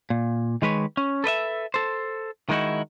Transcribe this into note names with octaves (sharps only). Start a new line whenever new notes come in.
A#2
D#3 G#3 B4 C#5
C#4
A4 B4 D#5 E5
A4 C5
D#3 G#3 D#4 E4 F#4